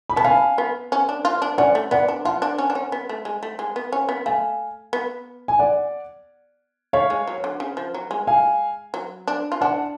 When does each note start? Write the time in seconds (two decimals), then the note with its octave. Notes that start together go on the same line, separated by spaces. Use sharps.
0.10 B5
0.16 B3 A5
0.24 C#4 F5 G#5
0.58 B3
0.92 C#4
1.09 D4
1.25 F4
1.42 D4
1.58 C#4 D5 F#5
1.75 A3
1.91 B3 D5 F#5
2.08 D4
2.25 F4 F#5 A5
2.42 D4
2.58 C#4
2.70 D4
2.75 C#4
2.92 B3
3.09 A3
3.25 G#3
3.43 A3
3.59 G#3
3.76 B3
3.92 C#4
4.09 B3
4.26 A3 F5 G#5
4.93 B3
5.48 G#5
5.59 D5 F#5
6.93 A3 C#5 F5
7.10 G#3
7.27 F#3
7.44 D3
7.60 C#3
7.77 F3
7.94 F#3
8.11 G#3
8.27 F5 G#5
8.94 F#3
9.27 D4
9.52 F4
9.61 D4 F#5 A5